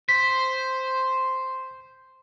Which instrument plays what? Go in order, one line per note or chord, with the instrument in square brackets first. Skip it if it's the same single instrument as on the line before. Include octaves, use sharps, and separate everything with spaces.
[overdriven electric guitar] C5 [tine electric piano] B6